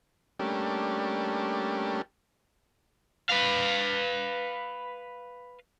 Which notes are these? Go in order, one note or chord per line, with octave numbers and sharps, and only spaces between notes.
G3 A3 A#3 C#4 D4 G4
B4 F5